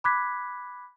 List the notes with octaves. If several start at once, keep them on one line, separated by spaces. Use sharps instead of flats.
B5 D6 F#6 G#6 B6